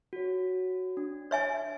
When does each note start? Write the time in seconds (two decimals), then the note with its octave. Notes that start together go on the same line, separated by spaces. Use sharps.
0.13 F#4 C#5
0.97 D4
1.31 C#5 E5 G#5